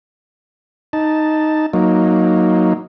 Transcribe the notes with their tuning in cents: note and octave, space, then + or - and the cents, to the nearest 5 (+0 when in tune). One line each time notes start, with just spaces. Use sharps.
D#4 +0 A5 +0
F#3 -10 A#3 +0 D#4 +0